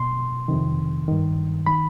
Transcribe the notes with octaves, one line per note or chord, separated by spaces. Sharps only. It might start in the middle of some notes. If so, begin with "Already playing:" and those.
Already playing: B2 C6
F2 C3 D#3
G2 D#3
D#3 B5